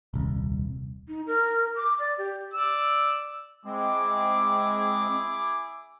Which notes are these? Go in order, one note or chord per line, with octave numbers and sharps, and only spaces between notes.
D#1 C2
D#4
A#4
D6
D5
G4
D5 E6
G#3 C4 E4 G#4 D6